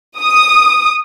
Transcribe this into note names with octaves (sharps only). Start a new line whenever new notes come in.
D#6